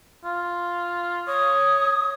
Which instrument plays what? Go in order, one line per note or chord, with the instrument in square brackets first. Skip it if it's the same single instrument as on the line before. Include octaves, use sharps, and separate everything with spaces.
[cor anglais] F4
[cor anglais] C#5 [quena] D#6